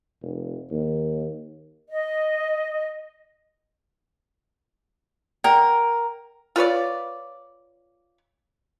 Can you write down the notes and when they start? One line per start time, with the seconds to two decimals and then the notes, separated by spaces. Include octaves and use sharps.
0.22 F1
0.71 D#2
1.90 D#5
5.44 A#4 D5 F#5 G5
6.56 F4 B4 C#5 D5